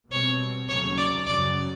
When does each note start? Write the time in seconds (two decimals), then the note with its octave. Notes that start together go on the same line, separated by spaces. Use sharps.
0.11 B2 G3 C4 C#5
0.69 D#2 C#3 F#3 A3 C#5
0.98 D5
1.26 F#2 C#3 F#3 D5